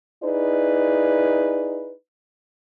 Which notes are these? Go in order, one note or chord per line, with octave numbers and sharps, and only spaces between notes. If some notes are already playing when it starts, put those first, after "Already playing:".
D#4 E4 G#4 B4 D5